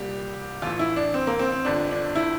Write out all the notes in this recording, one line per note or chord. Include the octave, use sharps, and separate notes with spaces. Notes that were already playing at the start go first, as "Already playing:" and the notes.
Already playing: C2 A#2 G3 G4
A1 A2 E3 F4
E4
D4
C4
A#3
C4
C4
G1 F2 D3 F3 D4
D4
E4